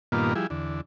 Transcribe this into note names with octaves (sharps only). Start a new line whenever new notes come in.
G2 A#2 D#3 A#3 B3 F4
F3 G3 E4 G#4
E2 D3